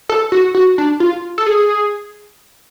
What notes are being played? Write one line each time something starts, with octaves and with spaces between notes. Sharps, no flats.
A4
F#4
F#4
D4
F4
A4
G#4